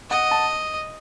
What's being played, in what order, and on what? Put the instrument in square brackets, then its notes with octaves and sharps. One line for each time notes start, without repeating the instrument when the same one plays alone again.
[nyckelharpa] D#5 [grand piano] F#5
[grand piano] A5